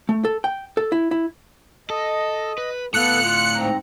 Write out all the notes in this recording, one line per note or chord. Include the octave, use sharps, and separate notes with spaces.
A3
A4
G5
A4
E4
E4
A4 D#5
B4
A2 B3 A4 F5 F#6 C#7
F4
G#2 C4 A#5